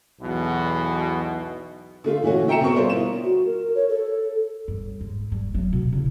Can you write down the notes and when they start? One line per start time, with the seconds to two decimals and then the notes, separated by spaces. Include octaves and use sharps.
0.21 B1 E2 B2
2.04 D3 A3 F4
2.22 A#2 E3 A3 C#4 F#4
2.48 E5 G5 A#5 C#7 E7
2.61 B2 C4 A#4 C#6
2.76 G3 F4 A#4 C5 C#5
2.90 B3 E4 E7
3.24 F#4
3.46 A#4
3.75 C#5
3.89 A4
4.68 G2
5.01 G#2
5.32 G3
5.54 F#3 A3
5.73 B2
5.93 C#3 E4